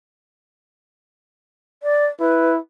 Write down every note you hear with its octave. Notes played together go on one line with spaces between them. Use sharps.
D5
E4 B4